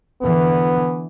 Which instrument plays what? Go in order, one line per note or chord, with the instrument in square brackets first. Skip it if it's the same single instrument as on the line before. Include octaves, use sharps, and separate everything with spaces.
[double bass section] D3 E3 [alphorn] B3